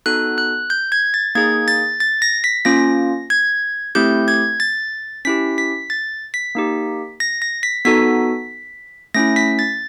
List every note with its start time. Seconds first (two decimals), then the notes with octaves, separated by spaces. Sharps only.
0.06 B3 D#4 F#4 A4 F#6
0.38 F#6
0.70 G6
0.92 G#6
1.14 A6
1.35 A#3 D#4 G#4 G#6
1.68 A6
2.00 A6
2.22 A#6
2.44 B6
2.65 A#3 C#4 F4 A#6
3.30 G#6
3.95 A3 C4 E4 G4 G6
4.28 G#6
4.60 A6
5.25 C#4 E4 G4 B6
5.58 B6
5.90 A6
6.34 B6
6.55 A#3 D#4 G4
7.20 A#6
7.42 A#6
7.63 B6
7.85 B3 D#4 F#4 A4 B6
9.14 A3 C#4 E4 A#6
9.36 B6
9.59 A6